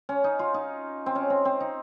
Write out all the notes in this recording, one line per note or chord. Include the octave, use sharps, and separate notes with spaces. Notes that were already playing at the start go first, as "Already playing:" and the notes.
C#4
D#4
F4
D#4
C4
C#4
C4
C4
D#4